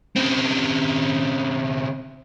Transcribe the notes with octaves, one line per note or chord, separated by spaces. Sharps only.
C#3 C4